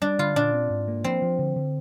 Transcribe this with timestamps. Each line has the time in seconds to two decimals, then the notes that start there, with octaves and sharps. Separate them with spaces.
0.02 G3 D4
0.19 D3 F4
0.36 A#2 D4
0.53 C4
0.70 G#2
0.88 A#3
1.04 F3 C4
1.22 F3
1.39 D3
1.56 D3